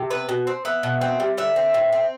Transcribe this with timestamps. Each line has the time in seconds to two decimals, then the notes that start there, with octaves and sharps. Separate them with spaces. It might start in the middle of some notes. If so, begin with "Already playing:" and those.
Already playing: C3
0.10 B3 B4
0.29 B2
0.47 C4
0.65 B3 E5
0.83 B2
1.01 C4
1.20 G3
1.38 D3 E5
1.56 C4
1.74 A2
1.92 C4